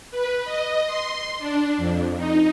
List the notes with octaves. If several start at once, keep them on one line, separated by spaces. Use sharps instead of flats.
B4
D#5
C6
D4
F2
D#4